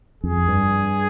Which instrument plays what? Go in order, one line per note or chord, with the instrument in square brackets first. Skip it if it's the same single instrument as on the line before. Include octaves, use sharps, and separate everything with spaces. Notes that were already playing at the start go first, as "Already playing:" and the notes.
[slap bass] F2 [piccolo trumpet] G#4
[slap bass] G2